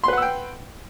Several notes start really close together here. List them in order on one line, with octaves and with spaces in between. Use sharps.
C6 B4 F#5 E6 G5